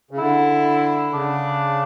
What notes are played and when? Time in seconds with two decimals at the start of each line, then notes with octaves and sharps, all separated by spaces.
0.11 C#3
0.18 D3 E4
1.13 C#3 D4